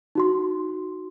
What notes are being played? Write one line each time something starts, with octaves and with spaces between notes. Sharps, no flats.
D#4 F#4 C6